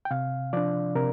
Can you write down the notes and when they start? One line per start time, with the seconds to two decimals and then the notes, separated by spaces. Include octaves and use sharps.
0.05 G5
0.11 C3 F5
0.53 F3 D4 D5
0.96 C3 A#4